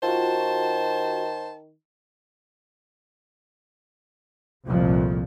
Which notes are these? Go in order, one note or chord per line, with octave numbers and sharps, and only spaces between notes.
D#3 F4 F#4 C5 A5
F1 C2 F2 A#2 F3